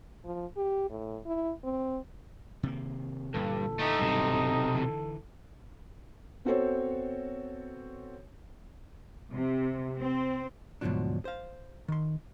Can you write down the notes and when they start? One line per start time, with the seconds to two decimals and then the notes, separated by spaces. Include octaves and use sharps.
0.25 F3
0.57 G4
0.90 A2
1.26 E4
1.64 C4
2.63 C3 D#3 A#3
3.34 G2 A#2 D3 E3 A4
3.79 A3 D#4 G4
3.99 D#1 B1 G2 C3 G3
4.75 D3 E3
6.45 B3 C4 F#4 A4 C5 C#5
9.33 C3
10.01 C4
10.81 D2 G#2 B2 F3 F#3 D4
11.25 C5 F5
11.88 D#3 C6